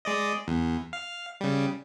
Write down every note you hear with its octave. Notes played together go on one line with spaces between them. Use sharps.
G#3 D5 D#5
E2
F5
C#3 G3